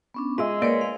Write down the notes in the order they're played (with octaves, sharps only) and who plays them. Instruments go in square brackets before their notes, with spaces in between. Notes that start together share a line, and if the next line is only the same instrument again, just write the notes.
[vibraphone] B3 C#4 D4
[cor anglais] G#3 [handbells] F4 G#4 E5 [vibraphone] D#5 E6
[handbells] A#3 D5 D7 [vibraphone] A#4 B4 C#5
[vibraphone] C#5 F5